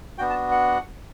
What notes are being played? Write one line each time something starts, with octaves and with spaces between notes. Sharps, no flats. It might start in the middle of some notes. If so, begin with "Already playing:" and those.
B3 D4 F#4 G5
A5
F#5